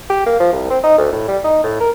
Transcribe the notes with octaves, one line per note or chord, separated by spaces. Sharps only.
G4
A#3
F3
C2
C4
D#4
D2
A2
G3
D#4
A2
A#4